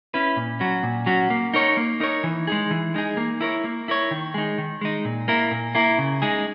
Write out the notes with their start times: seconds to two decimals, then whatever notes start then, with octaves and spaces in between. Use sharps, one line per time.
0.14 C#4 E4 B4
0.37 A#2
0.60 F#3 C#4 F#4
0.83 A#2
1.06 F#3 C#4 F#4
1.30 A#3
1.54 D#4 A#4 C#5
1.77 A#3
2.00 D#4 A#4 C#5
2.24 E3
2.47 G#3 D#4 G#4
2.71 E3
2.94 G#3 D#4 G#4
3.17 A#3
3.41 E4 A#4 C#5
3.64 A#3
3.88 E4 A#4 C#5
4.11 D#3
4.34 G#3 D#4
4.58 D#3
4.81 G#3 D#4
5.05 A#2
5.28 A#3 E4 A#4
5.51 A#2
5.75 A#3 E4 A#4
5.98 C#3
6.22 G#3 D#4 G#4